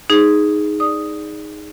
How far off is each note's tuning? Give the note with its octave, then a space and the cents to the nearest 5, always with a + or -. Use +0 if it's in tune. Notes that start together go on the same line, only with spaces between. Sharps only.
D#4 +0 G#4 +0
D5 +0 D#6 +0